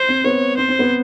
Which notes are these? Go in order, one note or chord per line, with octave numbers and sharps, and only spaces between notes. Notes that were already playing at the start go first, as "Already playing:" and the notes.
Already playing: C5
C4
B3 C#5
C4 C5
C4
B3